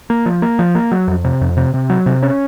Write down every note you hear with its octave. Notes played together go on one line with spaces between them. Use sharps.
A#3
F3
A#3
F3
A#3
F#3
F2
C3
F2
C3
C3
F#3
C3
C#4